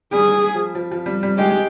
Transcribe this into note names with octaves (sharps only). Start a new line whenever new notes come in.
G3 G#4
F3
F3
F3
G3
G3
G#3 G4
G#3